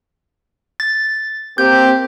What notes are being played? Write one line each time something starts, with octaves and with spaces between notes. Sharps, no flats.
A6
A#3 C4 G4 G6